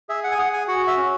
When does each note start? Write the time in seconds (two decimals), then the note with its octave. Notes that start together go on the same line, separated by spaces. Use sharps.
0.09 G#4 E5
0.24 F#5
0.31 G#5
0.38 G#4 F#5
0.53 G#5
0.68 F#4 F#5
0.87 E5
0.97 C#4